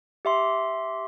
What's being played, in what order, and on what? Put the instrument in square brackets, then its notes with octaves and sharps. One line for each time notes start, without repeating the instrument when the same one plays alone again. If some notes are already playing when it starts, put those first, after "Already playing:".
[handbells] G4 E5 C6